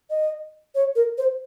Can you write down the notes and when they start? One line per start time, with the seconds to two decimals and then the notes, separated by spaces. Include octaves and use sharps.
0.10 D#5
0.75 C#5
0.96 A#4
1.18 C5